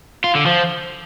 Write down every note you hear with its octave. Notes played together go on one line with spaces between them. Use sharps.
F4
D3
F3